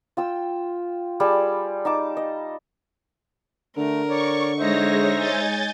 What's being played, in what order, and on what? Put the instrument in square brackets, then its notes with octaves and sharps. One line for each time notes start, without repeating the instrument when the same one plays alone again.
[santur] F4 G5 E6
G3 G#4 A5 B5
D#4 A5 D6
D#5
[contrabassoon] D3 [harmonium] A3 [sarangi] A#4
[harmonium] C#5 D5 [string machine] C#6
[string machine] G#3 C#5 A#6 [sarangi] D#4 [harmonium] C5 E5
[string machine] G#5 G6 A6